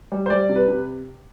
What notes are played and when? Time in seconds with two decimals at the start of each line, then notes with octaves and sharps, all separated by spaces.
0.12 G3
0.26 C5
0.30 G3 D5
0.49 C3
0.55 B4
0.68 C3